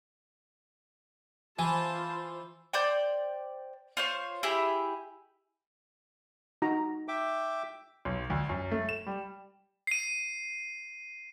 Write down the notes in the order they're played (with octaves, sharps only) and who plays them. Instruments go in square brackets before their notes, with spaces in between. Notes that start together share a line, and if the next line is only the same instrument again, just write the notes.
[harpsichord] E3 [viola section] F4 C5 [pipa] G#5 [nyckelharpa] A5
[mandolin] C5 D5 G5
F4 C5 C#5
E4 G4 G#4 E5
[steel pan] D#4 F#4 A#5
[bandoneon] E5 G5 D6
[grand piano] B1
D2
F#2
A3
E7
G3
[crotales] C7 D#7